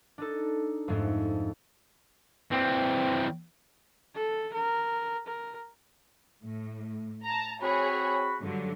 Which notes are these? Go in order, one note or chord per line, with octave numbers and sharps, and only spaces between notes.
D4 D#4 A4
F2 G#2 G#3 A3
E3 C4
A4
A#4
A#4
A2
A5 A#5
C4 F#4 G#4 C#5 B5
G2 D3 F#3